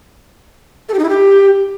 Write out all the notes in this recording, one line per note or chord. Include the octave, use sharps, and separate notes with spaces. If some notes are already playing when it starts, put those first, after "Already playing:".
A4
G4
D#4
E4
G4